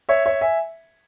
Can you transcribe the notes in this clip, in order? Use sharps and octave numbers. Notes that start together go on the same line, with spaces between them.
C#5 E5
C#5 E5
E5 G#5